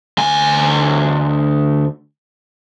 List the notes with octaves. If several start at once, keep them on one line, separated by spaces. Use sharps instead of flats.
D2 G#5